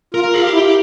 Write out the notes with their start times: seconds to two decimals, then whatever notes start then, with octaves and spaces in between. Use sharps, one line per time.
0.14 F4 A#4
0.35 F4 G#4
0.44 G4
0.53 E4